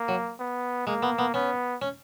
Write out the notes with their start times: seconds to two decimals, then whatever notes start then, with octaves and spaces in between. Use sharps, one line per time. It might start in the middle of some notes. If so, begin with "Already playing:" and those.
Already playing: A#3
0.08 F#3
0.40 B3
0.87 G#3 A#3
1.03 B3
1.19 B3
1.34 B3 C#4
1.82 C#4